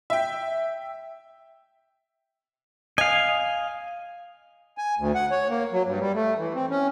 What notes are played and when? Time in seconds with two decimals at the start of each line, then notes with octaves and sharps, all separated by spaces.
0.10 E5 G5
2.98 D#5 F5 G#5
4.78 G#5
4.98 D2
5.15 F#5
5.31 C#5
5.50 A#3
5.72 F#3
5.85 G2
6.00 G3
6.14 A3
6.39 E3
6.55 C4
6.70 C#4